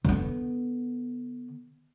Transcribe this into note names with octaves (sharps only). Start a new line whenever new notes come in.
D3 B3